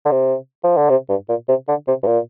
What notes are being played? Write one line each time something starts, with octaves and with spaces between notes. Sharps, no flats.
D3
C3
F3
D3
C3
G2
A#2
C3
D3
C3
G2
A#2